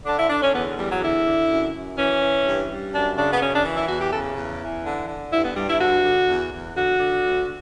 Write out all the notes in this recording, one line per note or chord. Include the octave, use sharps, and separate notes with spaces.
D3 D4
E4
D3 D4
C#4
E2 B3
E2 G3
F#3
D3 E4
D3
F#2
F#2
E3 C#4
E3
G2
G2
F#2 D4
C#3 D4
B3
F#2 C#4
D4
E3
E4
E2 F#4
G4
C#3 A4
E2
E3
D3
D3
G2 E4
B3
G2 G3
E4
D3 F#4
D3
E2
E2
D3 F#4
D3
D2